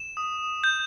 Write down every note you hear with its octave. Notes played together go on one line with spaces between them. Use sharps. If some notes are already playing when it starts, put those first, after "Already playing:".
Already playing: E7
D#6
G6